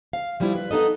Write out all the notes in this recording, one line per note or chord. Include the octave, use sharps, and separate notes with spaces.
F5
F3 G3 B3 E4
B4
B3 D#4 A4 D#5